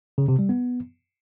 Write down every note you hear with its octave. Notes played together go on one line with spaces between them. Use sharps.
C#3
C3
G3
B3